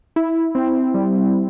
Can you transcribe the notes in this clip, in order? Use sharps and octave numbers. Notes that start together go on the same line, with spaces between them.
E4
C4
G3